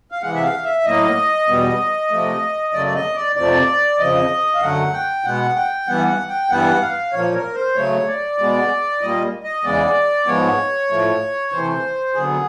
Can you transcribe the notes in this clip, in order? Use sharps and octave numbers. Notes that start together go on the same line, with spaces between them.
F5
C3 E3 G#3 F#5
E5
F5
E5
A2 F#3 A#3 D#5
E2 B2 G3 B3
C3 F3 A3
F#2 C#3 F#3 A3 D5
D5
D#5
D5
F2 C3 F3 A3 D5
F2 C#3 F3 D#5
F5
F#2 D3 F#3 A3 F#5
G5
B2 G#3 B3 F#5
G5
G2 E3 G3 B3 F#5
F#5
G5
G2 E3 G3 B3 F#5
F5
A#2 F3 A#3 C#5
A#4
C5
C#3 F#3 A3 C#5
D5
B2 G#3 B3
A#2 G3 A#3 D#5
D#5
E2 C#3 E3 G#3 B3 D5
G#2 F3 G#3 B3 C#5
A2 F3 A3
C3 E3 A3 C5
F#2 D3 F#3 B3 G#4